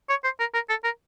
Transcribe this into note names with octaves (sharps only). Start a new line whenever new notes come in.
C#5
C5
A#4
A#4
A4
A#4